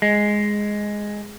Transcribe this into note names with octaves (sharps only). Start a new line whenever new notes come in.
G#3